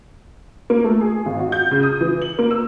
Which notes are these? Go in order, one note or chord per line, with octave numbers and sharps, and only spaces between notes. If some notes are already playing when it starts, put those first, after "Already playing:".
A#3
A3
G#4
G#1
F#4
G6
C#3
D#6
E3
F#7
A#3
E6